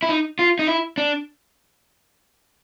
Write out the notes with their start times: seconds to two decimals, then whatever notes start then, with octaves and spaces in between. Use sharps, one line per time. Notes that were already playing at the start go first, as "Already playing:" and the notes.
0.03 E4
0.09 D#4
0.39 F4
0.59 D#4
0.67 E4
0.98 D4